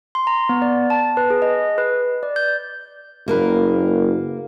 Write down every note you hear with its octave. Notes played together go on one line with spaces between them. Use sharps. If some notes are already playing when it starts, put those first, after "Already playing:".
C6
A#5
B3
D5
A5
B4
G#4
D#5
B4
D5
G6
F#1 A#3 A#4 B4